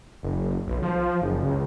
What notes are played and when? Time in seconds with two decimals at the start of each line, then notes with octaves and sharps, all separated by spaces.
0.23 F#1
0.67 B1
0.82 F3
1.21 F#1
1.43 C#2